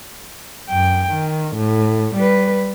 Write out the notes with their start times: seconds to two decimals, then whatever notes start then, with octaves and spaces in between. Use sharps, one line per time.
0.70 F#2 G5
1.13 D#3
1.56 A2
2.16 G3 B4